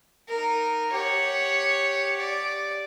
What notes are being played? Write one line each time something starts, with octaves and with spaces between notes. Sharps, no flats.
D#4 A#4
G4 C#5 F#5
D5